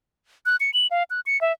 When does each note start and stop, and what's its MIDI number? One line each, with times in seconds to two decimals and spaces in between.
0.46 0.56 90
0.60 0.73 97
0.74 0.87 102
0.91 1.03 77
1.10 1.20 90
1.26 1.40 97
1.41 1.52 76